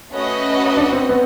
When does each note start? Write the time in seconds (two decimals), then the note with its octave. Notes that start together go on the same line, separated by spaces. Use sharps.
0.14 A3 C#4 F#4 B4 D#5
0.77 D4
0.93 C4
1.09 B3